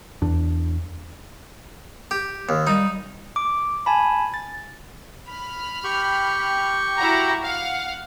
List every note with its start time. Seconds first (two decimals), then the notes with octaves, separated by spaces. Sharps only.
0.22 E2 D4
2.11 G4
2.49 D#2
2.67 G3 D#4
3.36 D6
3.86 G#5 A5 B5
4.34 A6
5.28 B5 F6
5.84 G4 G5 C#6
6.97 E4 F#4 A#5
7.43 F5 F#5